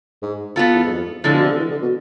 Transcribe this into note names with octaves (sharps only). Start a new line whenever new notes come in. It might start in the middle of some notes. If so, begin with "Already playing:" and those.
G#2
B3 F4 A4
E2
G#2
F2
A2 D3 F3 G#3
B2
C3
D3
E3
D3
B2